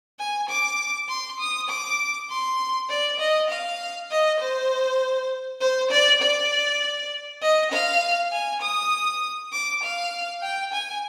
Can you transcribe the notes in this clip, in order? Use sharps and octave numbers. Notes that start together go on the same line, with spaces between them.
G#5
D6
C6
D#6
D6
C6
D5
D#5
F5
D#5
C5
C5
D5
D5
D#5
F5
G#5
D#6
D6
F5
G5
G#5